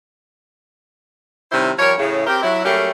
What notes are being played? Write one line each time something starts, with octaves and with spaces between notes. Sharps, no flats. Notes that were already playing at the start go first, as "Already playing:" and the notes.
C3 D#3 G3 C#4 E4 C5
F3 G3 A#4 C#5
A2 C#3
C4 G4 A#4
F#3 E4
F#3 G3 A3 A#3 C#4 G4